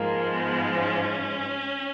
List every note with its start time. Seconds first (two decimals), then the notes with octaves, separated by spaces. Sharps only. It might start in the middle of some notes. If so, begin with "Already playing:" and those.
Already playing: G#2 F3 G#3 A#3
0.32 B3
0.80 C#4